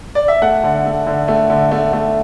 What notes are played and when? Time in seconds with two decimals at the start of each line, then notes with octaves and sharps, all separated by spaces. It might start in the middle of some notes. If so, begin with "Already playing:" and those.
0.15 D5
0.28 E5
0.42 A3 F#5
0.63 D3
0.85 A3
1.07 D3
1.28 A3
1.50 D3
1.71 A3
1.93 A3